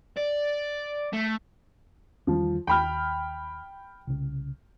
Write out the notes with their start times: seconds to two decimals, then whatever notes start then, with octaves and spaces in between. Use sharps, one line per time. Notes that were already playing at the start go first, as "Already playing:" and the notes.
0.17 D5
1.13 A3
2.27 E2 D#3 F3 G3
2.67 D#2 G5 B5 F6
4.07 C2 C#3